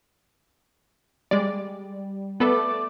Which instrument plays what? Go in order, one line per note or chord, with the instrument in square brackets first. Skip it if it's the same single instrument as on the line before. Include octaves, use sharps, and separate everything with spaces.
[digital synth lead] G3 [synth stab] G#3 D5
[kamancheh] A3 D5 [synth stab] B3 A4 B4